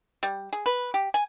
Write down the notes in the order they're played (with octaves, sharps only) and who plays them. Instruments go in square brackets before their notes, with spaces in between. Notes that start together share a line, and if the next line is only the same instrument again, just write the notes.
[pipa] G3
G#4
B4
G4
G#5